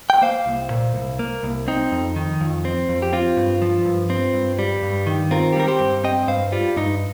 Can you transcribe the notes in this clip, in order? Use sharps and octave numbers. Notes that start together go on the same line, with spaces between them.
G5
A#3 C5 F5
C2
A#2
C2
A#3
C2
C4 D#4
F2
D#3
F2
C4
F2
G4
C4 F4
G2
F3
G2
C4
G2
G3
G2
D#3
C4 F4 A#4
G4
G3 A#4
G4 C5
G2
C4 D#5 G5
G2 C5 F5
G3 F4
G2 D#4